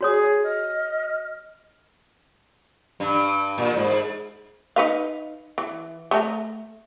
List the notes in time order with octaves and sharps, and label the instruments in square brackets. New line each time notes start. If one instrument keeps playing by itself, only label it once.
[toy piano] F#4 C#5 D#6 [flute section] G#4
[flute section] D#5 F6
[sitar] G2
A#2
G#2
[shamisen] D#4 B4 F5
E3
A3 A4 A#5